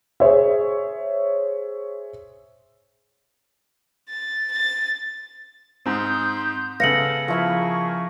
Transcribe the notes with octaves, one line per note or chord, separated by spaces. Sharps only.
G#4 C5 C#5 E5
A6
A6
G#2 C4 C6 D#6 G6
C#3 B3 A4 F5 A#6 C#7 F#7
F3 E4 G#4 A#4 F5 C#6